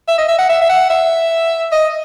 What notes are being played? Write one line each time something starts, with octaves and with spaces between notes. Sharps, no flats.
E5
D#5
E5
F#5
E5
E5
F#5
E5
D#5